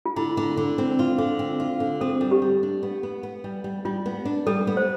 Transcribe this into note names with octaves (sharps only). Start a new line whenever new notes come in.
F4
D3 E4
D3
D3
C4
F4
D3
C4
F4
D3
C4 A4
G3
G4
G3
D4
B3
B3
B3
G3
G3
G3 F4
B3
D4
G3 A4
B3
C5